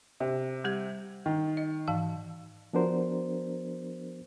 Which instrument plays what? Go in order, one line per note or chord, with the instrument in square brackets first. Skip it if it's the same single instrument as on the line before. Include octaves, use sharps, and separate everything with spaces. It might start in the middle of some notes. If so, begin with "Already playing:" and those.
[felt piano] C3
[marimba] G3 G4 G#6
[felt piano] D#3
[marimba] D#5
G#2 E3 F5
[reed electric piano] F3 B3 D4 F#4 A#4 C5